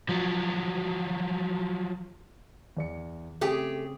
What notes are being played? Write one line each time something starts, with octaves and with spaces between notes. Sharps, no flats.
F3 F#3
E2 D5 C#7
C#3 A3 C4 G4 G#4